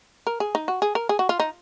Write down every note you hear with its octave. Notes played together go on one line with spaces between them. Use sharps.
A#4
G#4
D#4
F#4
G#4
A#4
G#4
F#4
F4
D#4